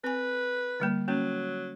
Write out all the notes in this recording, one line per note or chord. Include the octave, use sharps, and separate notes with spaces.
C4 B4 G#5
D3 G3 A#3
F#3 A#3 C#4